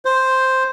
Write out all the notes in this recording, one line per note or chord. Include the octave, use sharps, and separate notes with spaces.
C5